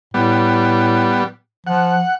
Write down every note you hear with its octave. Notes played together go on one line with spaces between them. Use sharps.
A2 G3 B3
F3 F#5